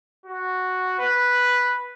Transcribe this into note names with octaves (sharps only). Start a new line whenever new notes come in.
F#4
B4